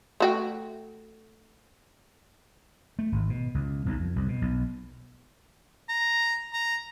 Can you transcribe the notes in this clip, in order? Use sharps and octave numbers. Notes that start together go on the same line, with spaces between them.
A3 F#4 G5
A3
G#1
B2
C#2
B1
F2
C2
B2
B1
A#5
A#5